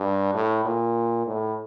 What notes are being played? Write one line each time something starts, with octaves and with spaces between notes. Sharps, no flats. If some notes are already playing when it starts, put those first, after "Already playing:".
Already playing: G2
A2
A#2
A2